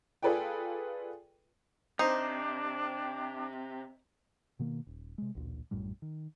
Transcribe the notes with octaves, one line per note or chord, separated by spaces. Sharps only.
F4 G#4 A4 B4 D5 G5
C3 D4 D#4 C5
B2 D#3 A#3
D#1
C3 G#3
A1 D2 A#2
A#1 F#2 A2 G3
D#3